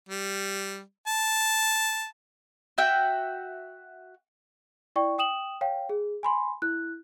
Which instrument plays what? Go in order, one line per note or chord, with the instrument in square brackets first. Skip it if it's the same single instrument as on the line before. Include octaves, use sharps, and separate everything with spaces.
[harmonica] G3
A5
[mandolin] F#4 E5 G5
[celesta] E4 D5 G5 C#6
G5 D#6 E7 F#7
C#5 F5 G5
G#4
G#5 B5 C6
E4 F#6